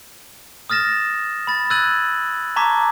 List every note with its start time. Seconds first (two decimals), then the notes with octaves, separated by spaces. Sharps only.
0.70 D#6 F6 A6 A#6 E7
1.47 B5 A6
1.70 E6 F#6 G#6 A6 D#7 F#7
2.56 A5 A#5 C#6 D6 G#6 B6